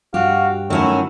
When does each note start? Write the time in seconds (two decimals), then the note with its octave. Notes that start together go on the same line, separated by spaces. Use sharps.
0.14 G2 F#4 G4 F5
0.70 D#3 F#3 A3 C#4 E4